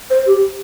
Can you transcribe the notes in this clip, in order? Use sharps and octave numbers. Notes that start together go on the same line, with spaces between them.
C5
G4